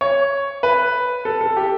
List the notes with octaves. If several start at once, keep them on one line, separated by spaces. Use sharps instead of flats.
C#5
B4
A4
A4
G4